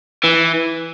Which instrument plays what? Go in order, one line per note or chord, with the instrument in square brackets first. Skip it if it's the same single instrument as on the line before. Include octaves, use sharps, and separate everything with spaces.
[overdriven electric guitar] E3